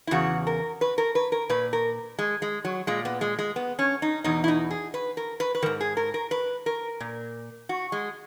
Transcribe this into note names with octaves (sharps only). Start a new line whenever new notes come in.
E4
E2 C#3 F#4
A#4
B4
A#4
B4
A#4
A#2 B4
A#4
G#3
G#3
F#3
A#2 G#3
B3
G#3
G#3
B3
C#4
D#4
E2 B2 D#4
E4
D#4
G#4
B4
A#4
B4
B4
G#2 D#3 A#4
G#4
A#4
A#4
B4
A#4
A#2
F#4
G#3